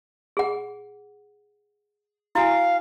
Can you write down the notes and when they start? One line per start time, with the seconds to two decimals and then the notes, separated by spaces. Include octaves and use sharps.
0.37 G#4 F#5
2.35 E4 F#4 F5 G#5